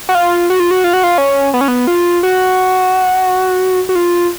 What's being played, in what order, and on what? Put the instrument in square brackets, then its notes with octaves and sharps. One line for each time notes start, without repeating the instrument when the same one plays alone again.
[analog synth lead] F#4
F4
F#4
F4
F#4
F4
F#4
F4
C#4
B3
C#4
B3
F4
F#4
F#4
F4